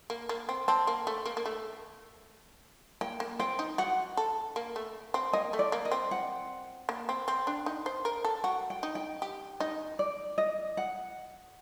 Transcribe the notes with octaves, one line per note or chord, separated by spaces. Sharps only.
A#3
A#3
C4
C4 A5
A#3
A3
A#3
A#3
A3
A#3 G5
A#3
C4 G5
D#4
F#4 F#5
A4
A#3
A3
C4
A#3 D#5
A3
D5
A#3
D#5
C4
F#5
A#3
C4
C4
D4
D#4
C5
A#4
A4
F#4 G5
G5
D#4
G5
G4
D#4 D#5
D5
D#5
F#5